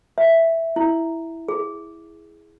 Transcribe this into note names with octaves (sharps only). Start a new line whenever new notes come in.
E5
E4
G#4